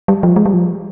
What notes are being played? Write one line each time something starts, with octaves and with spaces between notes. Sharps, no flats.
G3
F3
G#3
G3
F3